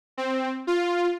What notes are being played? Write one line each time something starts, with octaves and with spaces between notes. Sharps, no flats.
C4
F4